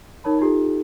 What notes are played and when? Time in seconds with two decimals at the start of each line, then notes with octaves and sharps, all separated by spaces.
0.24 D#4 A#4 C#5 A5 B5
0.39 D#4 F4 G4 A4